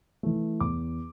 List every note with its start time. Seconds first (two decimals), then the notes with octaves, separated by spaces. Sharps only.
0.23 E3 A3
0.60 E2 D6